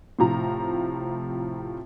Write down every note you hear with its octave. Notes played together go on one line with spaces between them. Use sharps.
A2 C3 F3 A#5